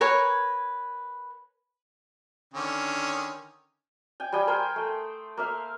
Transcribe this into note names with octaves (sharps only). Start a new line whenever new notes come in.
A#4 B4 C#5 G#5
D3 D#3 C#4
G5 G#5
G3 D#5 G5 G#5
A#4 C5 G5 G#5
A3
A#3 E5 F5